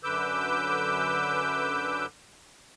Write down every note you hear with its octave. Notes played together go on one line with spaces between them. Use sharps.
F#2 D3 B4 D6 E6 G6